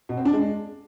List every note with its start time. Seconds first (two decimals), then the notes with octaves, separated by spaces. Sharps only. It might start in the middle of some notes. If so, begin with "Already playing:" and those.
0.09 B2
0.17 C4
0.25 D4
0.34 G#3